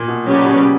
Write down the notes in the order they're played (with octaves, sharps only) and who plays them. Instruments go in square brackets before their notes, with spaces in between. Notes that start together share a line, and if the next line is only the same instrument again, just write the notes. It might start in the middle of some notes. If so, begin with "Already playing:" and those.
Already playing: [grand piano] A#2
B2
[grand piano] C#3 [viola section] F#3 C#4 G4 B4 D5
[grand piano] B2